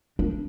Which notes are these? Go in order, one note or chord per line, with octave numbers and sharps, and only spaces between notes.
D4